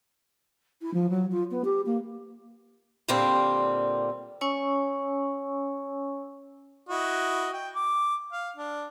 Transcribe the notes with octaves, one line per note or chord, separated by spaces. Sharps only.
E4
F3
F#3
F4
B3
G4
A#3
A#2 D3 G3 A#3 C4
C#4 C#5 G#5 C#6 E6
E4 F#4 D#5
G5
D6
F5
D4